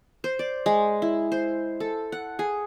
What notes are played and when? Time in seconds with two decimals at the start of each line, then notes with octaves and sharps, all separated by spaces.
0.24 C5
0.39 D5
0.66 G#3
1.02 E4
1.32 C5
1.80 A4
2.12 F#5
2.39 G#4